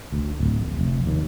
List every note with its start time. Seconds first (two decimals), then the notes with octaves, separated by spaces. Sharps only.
0.12 D2
0.40 D1
0.60 A#1
0.79 F1
1.06 D#2